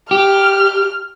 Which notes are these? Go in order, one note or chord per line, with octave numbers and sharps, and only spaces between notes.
G4 F6